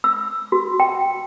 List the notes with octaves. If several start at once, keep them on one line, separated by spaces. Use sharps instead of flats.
E6
F#4
G5